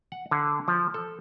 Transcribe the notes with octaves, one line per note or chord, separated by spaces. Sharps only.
F#5
D3
F3
A4